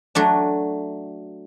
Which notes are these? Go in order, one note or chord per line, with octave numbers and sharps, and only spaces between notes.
F#3 A3 D4